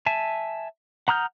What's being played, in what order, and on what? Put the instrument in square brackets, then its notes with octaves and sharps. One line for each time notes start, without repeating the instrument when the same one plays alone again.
[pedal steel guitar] E5 G#5 A5
F#5 A#5 D#6 F6 G6